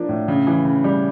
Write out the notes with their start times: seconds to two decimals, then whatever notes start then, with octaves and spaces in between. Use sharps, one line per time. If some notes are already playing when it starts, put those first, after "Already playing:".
Already playing: F3 A#3 D4
0.09 A2
0.28 C#3
0.47 E3
0.65 C#3
0.84 G3